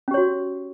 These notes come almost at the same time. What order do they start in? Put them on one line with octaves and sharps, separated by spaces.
C#4 G4 C#5 F#4